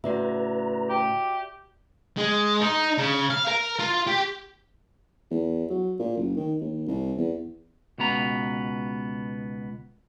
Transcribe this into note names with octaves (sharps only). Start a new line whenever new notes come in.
A2 C#3 F#4 B4 D5 E5 A#5
G4
G#3
D#4
C#3
F5
A#4
F4
G4
E2
F#3
A#2
F#1
D#3
D#2
C2
E2
C#2 B2 B3 A#5